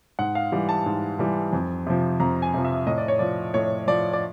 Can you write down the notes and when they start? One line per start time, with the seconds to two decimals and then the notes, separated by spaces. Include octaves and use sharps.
0.19 G#2 F#5
0.35 F5
0.52 E3 G3
0.69 A5
0.86 G#2
1.19 E3 G3
1.53 F2
1.86 C3 F3
2.20 F2 A#5
2.42 G#5
2.54 C3 F3
2.65 E5
2.87 A2 D#5
2.98 D5
3.08 C#5
3.19 F3 D5
3.54 A2 C#5
3.88 F3 D5
4.13 D5